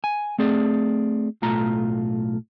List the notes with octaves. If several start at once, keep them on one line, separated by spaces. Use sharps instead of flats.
G#5
A3 C4 G#4 D5
B1 A2 A3 F4 A#5